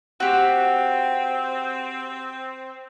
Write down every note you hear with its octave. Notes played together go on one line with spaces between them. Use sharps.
C4 F#4 G4